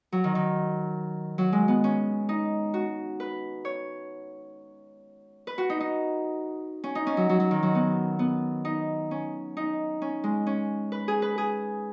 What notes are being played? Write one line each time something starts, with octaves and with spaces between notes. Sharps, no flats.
F#3
D#3
D#3
F#3
G#3
B3
C#4
D#4
F#4
B4
C#5
B4
F#4
D#4
D#4
C#4
D#4
C#4
F#3
F#3
F#3
D#3
F#3
B3
B3
D#4
C#4
D#4
C#4
G#3
C#4
B4
G#4
B4
G#4